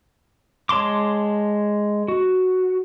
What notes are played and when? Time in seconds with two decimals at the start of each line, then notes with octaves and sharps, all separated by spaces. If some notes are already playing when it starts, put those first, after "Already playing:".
0.69 G#3 C#5 A5 C6 D6
2.08 F#4